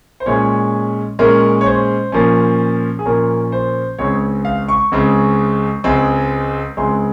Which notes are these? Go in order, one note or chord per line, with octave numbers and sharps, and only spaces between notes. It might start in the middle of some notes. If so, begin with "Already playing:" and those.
C5
A#2 G#3 C#4 C#5
A#2 G#3 C#4 A#4
C#5
C5
A#2 F3 A#3 C#4
G#4
A#2 F3 A#3 C#4 A#4
C5
C#2 C#3 G#3 C4 C#5
F5
C#6
C#2 C#3 G#3 C4
C#2 C#3 G#3 C4
C#2 C#3 G#3 C4 C6